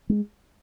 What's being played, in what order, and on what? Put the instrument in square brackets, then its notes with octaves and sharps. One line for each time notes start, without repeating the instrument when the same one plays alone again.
[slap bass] G#3